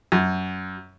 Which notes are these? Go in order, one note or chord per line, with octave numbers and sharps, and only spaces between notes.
F#2